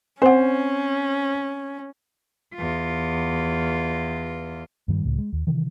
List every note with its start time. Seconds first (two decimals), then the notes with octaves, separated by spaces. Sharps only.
0.22 C4 C#4 C5 F#5
2.54 E2 F4
4.88 G2 D#3 F3 G3
5.05 C#2 A2
5.18 G#3
5.32 D#2
5.47 C3 D#3 E3